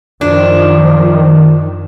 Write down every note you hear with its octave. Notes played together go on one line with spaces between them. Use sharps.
F#2 D#3 F3 D4